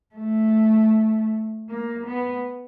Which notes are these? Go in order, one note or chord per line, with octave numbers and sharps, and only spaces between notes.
A3
A#3
B3